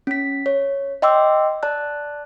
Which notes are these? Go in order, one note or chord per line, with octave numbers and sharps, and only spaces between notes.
C#4 B6
C#5
D#5 E5 G5 C6 D6 E6
D5 A5 F#6